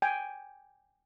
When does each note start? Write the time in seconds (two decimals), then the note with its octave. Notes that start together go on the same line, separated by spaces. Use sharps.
0.02 G5 G#5